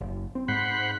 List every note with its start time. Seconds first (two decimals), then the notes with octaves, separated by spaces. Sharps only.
0.01 F#1
0.35 C4
0.48 G#2 C5 F#5 B5